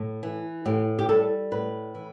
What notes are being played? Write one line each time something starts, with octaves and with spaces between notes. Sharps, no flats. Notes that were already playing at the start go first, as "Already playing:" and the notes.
Already playing: A2
E3
A2 G4
G4
G3 A4
A2 B4
E3